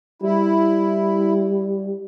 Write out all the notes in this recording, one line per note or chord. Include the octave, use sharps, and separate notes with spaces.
G3 E4